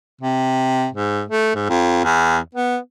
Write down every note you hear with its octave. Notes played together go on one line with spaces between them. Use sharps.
C3
G#2
A3
G#2
F2
E2
B3